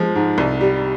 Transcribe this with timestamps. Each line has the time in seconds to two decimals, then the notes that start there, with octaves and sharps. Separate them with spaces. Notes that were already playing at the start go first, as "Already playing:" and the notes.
Already playing: F3 G#3
0.16 G#2
0.38 C2
0.61 G3